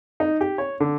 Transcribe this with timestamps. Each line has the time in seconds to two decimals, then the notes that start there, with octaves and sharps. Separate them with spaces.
0.20 D#4
0.41 G4
0.58 C#5
0.80 D3